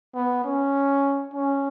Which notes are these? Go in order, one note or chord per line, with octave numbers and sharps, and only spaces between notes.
B3
C#4
C#4